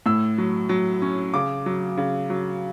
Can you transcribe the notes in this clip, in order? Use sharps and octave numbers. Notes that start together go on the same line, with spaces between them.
A2 E6
F#3
F#3
C#4
C#3 D6
F#3
C#3
F#3